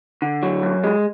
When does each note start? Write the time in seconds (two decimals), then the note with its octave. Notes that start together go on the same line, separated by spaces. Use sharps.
0.22 D3
0.43 F#3
0.63 F#2
0.84 G#3